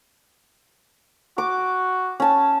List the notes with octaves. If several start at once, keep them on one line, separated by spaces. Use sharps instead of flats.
F#4 D6
C#4 A5